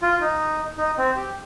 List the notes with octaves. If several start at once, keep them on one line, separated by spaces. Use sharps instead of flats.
F4
D#4
D#4
C4
G4